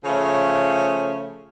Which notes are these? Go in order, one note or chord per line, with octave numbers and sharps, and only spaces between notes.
C#3 F3 A3 C#5